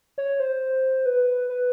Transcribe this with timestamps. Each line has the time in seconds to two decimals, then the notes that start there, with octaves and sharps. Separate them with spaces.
0.18 C#5
0.40 C5
1.06 B4
1.49 B4